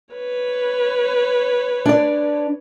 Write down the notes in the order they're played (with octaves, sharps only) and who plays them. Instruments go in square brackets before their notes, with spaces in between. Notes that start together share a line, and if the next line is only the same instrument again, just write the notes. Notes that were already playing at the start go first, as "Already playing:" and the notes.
[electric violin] B4 C#5
[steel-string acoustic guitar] D4 D5